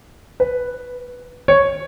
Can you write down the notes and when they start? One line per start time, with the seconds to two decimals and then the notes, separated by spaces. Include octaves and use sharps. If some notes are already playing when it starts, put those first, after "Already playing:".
0.40 B4
1.48 C#5